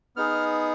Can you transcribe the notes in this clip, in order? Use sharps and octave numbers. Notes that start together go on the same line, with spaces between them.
B3 D#4 G#4 F6